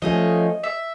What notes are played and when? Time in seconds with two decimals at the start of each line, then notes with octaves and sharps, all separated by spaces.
0.02 F3 A3 C#4 D#5
0.64 E5